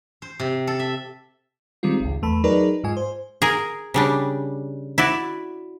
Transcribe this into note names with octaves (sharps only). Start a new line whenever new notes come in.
C5
C3
A4
E5
D#3 G3 G#3 C4 F4
G#1 C#2
E2 A3 A5 B5
F#3 D#4 G#4 A#4 B4 D5
G#2 G#3 F4 G#5
C5
G#4 A#4
C#3 G3 D4
E4 F#4 D5